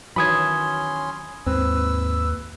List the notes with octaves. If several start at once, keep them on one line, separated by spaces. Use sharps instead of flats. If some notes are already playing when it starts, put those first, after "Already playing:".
D#3 E3 F#3 C#4 B5 C6 D#6 G#6
D#2 G#2 C4 B4 E6